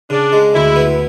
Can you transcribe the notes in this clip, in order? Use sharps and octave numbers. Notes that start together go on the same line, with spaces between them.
C#3 D4
G#3
D2 E4
B3